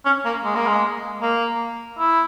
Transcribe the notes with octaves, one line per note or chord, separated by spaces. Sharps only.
C#4
A#3
G#3
A#3
G#3
A#3
E4